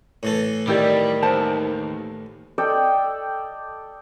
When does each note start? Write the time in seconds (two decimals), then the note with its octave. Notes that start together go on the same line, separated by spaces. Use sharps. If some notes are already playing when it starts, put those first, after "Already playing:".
0.23 A2 E3 A4
0.67 D#3 G3 E4 G4 D5
1.23 D#2 C5 A5
2.58 A4 D5 D#5 G5